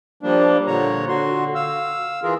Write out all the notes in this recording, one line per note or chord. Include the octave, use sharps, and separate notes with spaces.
F3 G3 A#3 D4
A#2 D3 C#5 A#5
D3 F#4 C6
F5 E6
E3 F4 G#4 A#4